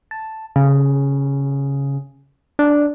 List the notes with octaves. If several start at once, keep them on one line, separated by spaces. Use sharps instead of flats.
A5
C#3
D4